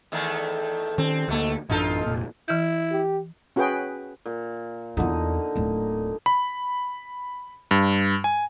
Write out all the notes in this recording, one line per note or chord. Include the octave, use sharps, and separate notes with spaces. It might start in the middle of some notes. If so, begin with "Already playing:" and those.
E2 D#3 A3
D#3 C4 C#4
D2 B2 A3 A#3
A1 F#2 D4 D#4 F4 A4
F1 A#2
E3 E4 G6
G4
C#4 F#4 G#4 B4 G5
A#2
E2 D3 D#4 F4
D1 A3
B5
G2
G#5